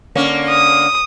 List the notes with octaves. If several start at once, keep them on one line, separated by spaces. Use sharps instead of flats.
D3 A#3 C#4
D#6